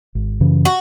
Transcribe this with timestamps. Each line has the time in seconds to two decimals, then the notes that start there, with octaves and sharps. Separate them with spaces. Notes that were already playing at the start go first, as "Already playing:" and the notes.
0.15 G#1
0.40 F#2 C#3 E3
0.65 F#4